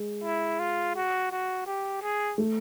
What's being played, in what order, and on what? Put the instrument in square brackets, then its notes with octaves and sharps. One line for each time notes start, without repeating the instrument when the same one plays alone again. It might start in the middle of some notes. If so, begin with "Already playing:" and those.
Already playing: [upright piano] G#3
[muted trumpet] E4
F4
F#4
F#4
G4
G#4
[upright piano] A3